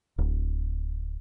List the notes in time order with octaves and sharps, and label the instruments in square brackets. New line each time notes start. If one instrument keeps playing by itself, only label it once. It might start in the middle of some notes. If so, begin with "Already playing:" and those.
[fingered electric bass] D1